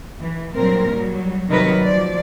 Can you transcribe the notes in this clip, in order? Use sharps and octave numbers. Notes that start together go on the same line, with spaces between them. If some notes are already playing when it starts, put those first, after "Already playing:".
E3
G2 A#2 F#3 C4 A#4
F#3 G3
C3 D#3 F#3 G3 A#4 B4
F3 F#3 D5